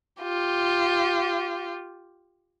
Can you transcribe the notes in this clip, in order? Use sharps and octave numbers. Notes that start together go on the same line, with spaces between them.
F4 G4